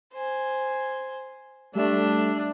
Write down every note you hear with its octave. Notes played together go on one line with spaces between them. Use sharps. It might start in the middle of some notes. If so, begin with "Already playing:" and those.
C5 G#5
G3 A3 D4 E5